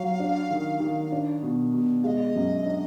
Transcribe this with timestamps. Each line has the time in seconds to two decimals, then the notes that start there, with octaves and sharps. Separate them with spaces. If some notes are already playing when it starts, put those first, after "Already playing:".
Already playing: F#3 F5
0.20 D4
0.51 D#3
0.80 D#3
1.12 D4
1.43 B2
1.73 B2
2.04 G#3 D#5 F5
2.35 F#2
2.65 D4